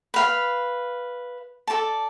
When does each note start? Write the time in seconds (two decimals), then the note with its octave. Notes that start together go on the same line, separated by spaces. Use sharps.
0.14 B4 F5 B5
1.67 A4 D5 A5